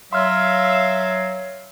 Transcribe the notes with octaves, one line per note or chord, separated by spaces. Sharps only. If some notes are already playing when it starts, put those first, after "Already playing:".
F#3 E5 F5 C6 F6